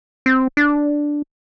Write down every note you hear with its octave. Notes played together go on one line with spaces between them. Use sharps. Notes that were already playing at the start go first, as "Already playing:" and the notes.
C4
D4